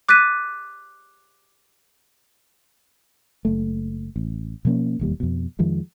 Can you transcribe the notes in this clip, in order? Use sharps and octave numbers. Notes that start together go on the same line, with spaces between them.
D6 F#6 A6 B6 D#7
F#1 A3
A1
B2 F3 A#3 C#4
E1 D#2 G3
F2 B2
F2 D#3 F3 G#3